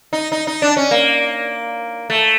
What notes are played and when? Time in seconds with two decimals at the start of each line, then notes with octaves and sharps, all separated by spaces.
0.13 D#4
0.32 D#4
0.47 D#4
0.62 D4
0.77 C#4
0.91 A#3
2.10 A3